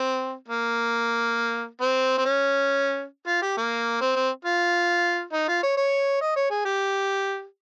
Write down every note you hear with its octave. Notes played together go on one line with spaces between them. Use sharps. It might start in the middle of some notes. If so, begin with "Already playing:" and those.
Already playing: C4
A#3
C4
C4
C#4
F4
G4
A#3
C4
C4
F4
D#4
F4
C#5
C#5
D#5
C#5
G#4
G4